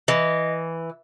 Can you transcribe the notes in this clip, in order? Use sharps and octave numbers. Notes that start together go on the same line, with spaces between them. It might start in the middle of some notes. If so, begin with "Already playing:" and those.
E3 D#5